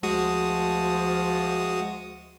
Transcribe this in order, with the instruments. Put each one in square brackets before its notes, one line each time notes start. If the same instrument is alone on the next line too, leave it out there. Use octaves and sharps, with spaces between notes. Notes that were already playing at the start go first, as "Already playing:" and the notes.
[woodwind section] D2 F3 [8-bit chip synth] G#3 F#4 D#6